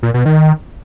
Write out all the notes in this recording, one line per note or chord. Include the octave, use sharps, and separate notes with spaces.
A#2
B2
D#3